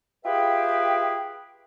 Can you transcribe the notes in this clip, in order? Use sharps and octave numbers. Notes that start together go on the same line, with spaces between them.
F4 G4 G#4 B4 E5 G5